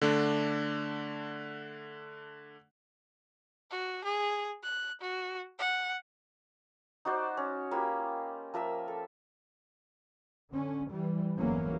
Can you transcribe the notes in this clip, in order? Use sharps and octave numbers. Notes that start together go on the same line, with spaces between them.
D3 A3 D4
F#4
G#4
F#6
F#4
F#5
D#4 F#4 C5 D5
C#4
A#3 F4 G4 B5
F3 A#4 E5 E6
A4
D3 C#4
E3 G3
G1 E2 E3 F#3 A#3 C#4